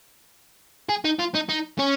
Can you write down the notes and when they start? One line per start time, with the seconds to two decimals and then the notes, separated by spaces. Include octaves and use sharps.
0.89 G#4
1.04 D#4
1.19 F4
1.34 D#4
1.49 D#4
1.79 C#4